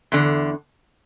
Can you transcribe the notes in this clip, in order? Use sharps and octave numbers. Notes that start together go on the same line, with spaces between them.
E2 D3